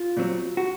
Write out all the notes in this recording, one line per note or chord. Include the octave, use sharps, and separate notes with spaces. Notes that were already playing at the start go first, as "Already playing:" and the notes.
Already playing: F4
A#2 F#3 C4
F#4